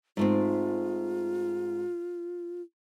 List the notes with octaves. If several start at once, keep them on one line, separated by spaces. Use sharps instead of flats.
G#2 A3 C4 F4